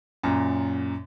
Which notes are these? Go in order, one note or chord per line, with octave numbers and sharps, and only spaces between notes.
F#2 A#2